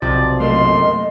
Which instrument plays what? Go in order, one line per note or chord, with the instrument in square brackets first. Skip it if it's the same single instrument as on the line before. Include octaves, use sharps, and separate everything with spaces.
[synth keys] B1 C3 F3 [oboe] D5
[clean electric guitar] F#2 A3 A#3 [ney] D#5 [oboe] C6